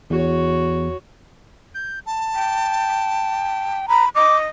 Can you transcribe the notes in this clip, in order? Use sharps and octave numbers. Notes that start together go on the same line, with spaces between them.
E2 F#4 C#5
G6
A5
G5
A#5 B5
D#5 D6